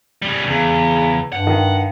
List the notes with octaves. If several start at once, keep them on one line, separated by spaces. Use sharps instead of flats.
C#3 G3
E2 C#3
G2 F#5
D#3